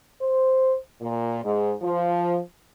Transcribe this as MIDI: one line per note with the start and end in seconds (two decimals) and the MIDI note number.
0.22 0.76 72
1.02 1.43 46
1.45 1.73 44
1.82 2.39 53